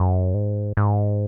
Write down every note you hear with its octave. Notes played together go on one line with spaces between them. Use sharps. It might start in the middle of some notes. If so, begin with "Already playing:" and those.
Already playing: F#2
G#2
G#2